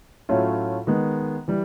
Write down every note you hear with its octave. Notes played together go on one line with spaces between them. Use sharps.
A2 F#3 A3 C#4 F4
D#3 G#3 B3
E3 G3